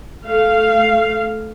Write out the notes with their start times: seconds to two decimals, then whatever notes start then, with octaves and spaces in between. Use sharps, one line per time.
0.24 A3 F5